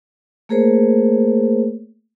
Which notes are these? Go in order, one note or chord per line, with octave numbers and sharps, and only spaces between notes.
A3 A#3 G#4 A#4 C5 C#5